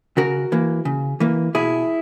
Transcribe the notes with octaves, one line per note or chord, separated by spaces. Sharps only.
C#3 F#4 A#4
E3 A#3
C#3
E3 A#3
B2 E4 G#4